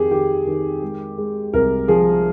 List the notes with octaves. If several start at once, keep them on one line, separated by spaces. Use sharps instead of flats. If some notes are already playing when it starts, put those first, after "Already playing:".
Already playing: F2 D#3 G4 G#4
D#3 G4
D#3
G#3
G#3
C2 A#4
F3 G#4